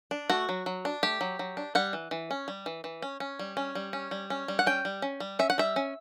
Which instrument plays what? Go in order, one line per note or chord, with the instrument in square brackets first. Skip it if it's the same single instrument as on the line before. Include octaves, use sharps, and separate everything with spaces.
[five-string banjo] D4
A3 F#4
F#3
F#3
D4
A3 G4
F#3
F#3
D4
G3 F#5
E3
E3
C#4
G3
E3
E3
C#4
C#4
G3
C#4
G3
C#4
G3
C#4
G3
F#5
C#4 G5
G3
C#4
G3
C#4 E5
F#5
G3 E5
C#4